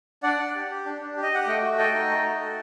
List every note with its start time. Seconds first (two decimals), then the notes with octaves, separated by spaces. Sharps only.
0.23 D4 D5 F#5
0.39 D4
0.55 G4
0.70 G4
0.86 D4
1.01 D4
1.16 G4
1.23 D#5
1.32 G4 F#5
1.47 A3 D#5 G5
1.62 F#4
1.78 A4 D#5 G5
1.94 D#4
2.10 A3
2.25 F#4
2.40 A4